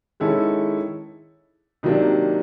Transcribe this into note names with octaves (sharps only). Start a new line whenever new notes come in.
D#3 G#3 C#4 E4 A4
C3 D#3 F#3 A#3 D4